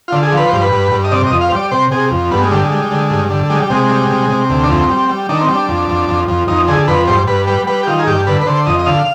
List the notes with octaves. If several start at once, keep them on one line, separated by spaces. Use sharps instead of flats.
D3 F4
G#4
F3
B4
G2 C5
B4
G2
G2
D#5
C3 D5
F2 D#5
F5
C5
G3 D5
C3 C5
C3 G#4
F2
G2 B3
G#3
D3 G3
G#3
G3
D3
G2
D3
G3 G#3
G3
C3 G#3
G3
C3
C3
D2
D4
F2 C4
G3
G3
D#3 D4
C4
G3
D4
F2
F2
F2
F2
F2 D#4
D3 G#4
F2 B4
G2 C5
G2 B4
G3 B4
G3 B4
G4
D#3 F4
G#4
G2 G4
D3 B4
B4
D3 C5
F2 D#5
D#5
D3 F5